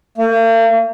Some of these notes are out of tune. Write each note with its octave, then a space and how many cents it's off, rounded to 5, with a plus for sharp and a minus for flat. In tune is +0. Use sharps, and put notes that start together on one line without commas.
A#3 -45